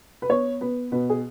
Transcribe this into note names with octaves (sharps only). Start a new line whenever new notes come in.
B4
B3 C#5
B3 B4
B2 B4
G#4